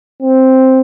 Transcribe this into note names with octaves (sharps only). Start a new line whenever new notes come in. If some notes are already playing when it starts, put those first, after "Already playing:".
C4